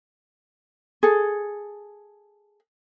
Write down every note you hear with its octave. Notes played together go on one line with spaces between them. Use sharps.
G#4 A4